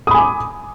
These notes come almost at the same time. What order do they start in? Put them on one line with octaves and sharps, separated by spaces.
D#6 B5 G#5 D6